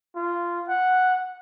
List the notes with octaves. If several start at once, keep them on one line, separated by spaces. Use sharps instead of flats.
F4
F#5